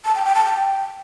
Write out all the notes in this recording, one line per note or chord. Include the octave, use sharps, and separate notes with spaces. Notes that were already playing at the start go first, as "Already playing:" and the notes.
A5
G5
G5
A5
G5